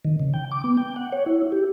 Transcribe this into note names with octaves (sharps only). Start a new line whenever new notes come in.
D#3
C#3
G5
D6
B3
G5
F#5
C#5
E4
G4